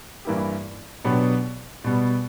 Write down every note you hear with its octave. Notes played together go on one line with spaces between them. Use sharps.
G2 E3 A#3 E4 G4
B2 F#3 B3 D4 G4
B2 G3 B3